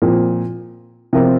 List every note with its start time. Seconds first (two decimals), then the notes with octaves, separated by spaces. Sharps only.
0.02 A#2 F3 C4
1.13 C3 F3 C4 F4 A#4